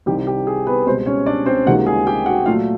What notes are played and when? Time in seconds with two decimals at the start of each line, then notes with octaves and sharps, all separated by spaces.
0.06 C2 C3 D#3 G4
0.27 G4
0.47 G#4
0.67 B3 B4
0.87 C#2 B2 G3 C4 C5
1.06 C#4 C#5
1.26 D4 D5
1.46 C4 C5
1.66 C#2 C3 D#3 G3 A#3 F#4 F#5
1.86 G#4 G#5
2.07 G4 G5
2.26 F#4 F#5
2.46 A#2 F#3 A3 F4 F5